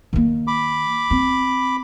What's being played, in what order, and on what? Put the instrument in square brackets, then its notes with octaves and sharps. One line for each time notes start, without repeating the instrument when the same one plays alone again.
[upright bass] D#3 A#3
[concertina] B5 D6
[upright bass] C4